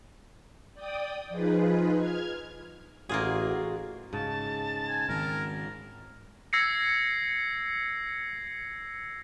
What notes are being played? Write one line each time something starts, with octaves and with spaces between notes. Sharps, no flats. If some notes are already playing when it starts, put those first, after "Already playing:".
D5 G5 D#6
F3 D#4 F4 G#4 B4
F6 G#6
A1 A#3 F4 F#4 G#4
G#2 C#3 A5
G#5
G#2 D#3 A#4
E6 G#6 A#6 C7 C#7